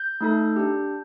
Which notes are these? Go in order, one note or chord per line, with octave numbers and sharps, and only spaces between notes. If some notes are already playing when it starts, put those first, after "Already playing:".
Already playing: G6
A3 D#4 A4
D4 G4